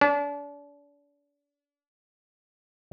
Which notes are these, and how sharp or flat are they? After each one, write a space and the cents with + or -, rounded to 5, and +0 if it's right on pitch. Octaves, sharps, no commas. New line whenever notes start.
D4 -35